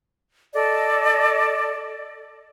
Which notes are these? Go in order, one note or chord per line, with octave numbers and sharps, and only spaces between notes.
A4 D5 D#5